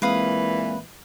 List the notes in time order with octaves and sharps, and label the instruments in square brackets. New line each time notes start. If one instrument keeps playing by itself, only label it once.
[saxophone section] A#2 E3 [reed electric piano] G#3 A#3 C4 [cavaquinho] B4 F5 D#6